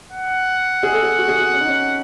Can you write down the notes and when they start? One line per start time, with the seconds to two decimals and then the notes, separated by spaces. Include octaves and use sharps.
0.12 F#5
0.83 G#4
0.92 A4
1.03 G#4
1.18 F#4
1.28 G#4
1.38 F#4
1.54 C#4
1.60 D#4
1.68 C#4